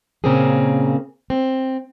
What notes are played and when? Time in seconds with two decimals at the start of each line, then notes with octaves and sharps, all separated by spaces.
0.24 A#2 C#3 A#3 C4 C#4 G#4
1.30 C4